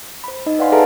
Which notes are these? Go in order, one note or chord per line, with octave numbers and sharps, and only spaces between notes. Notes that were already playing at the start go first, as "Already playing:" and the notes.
C5 B5
D#4 D#5
B4 D5 F5 F#5 G#5 C6
G#4 A4 B4 E5 A5 A#5